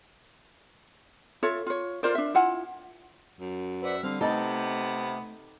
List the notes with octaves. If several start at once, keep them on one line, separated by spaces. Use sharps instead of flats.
F4 A4 C#5 E5
F4 C#5
F4 A#4 C5 D5
D4 E5
E4 F4 F#5 G#5
F#2
B4 C5 D5 E5 F#5
D3 G3 C4 F5
C3 A3 B3 D#4 A4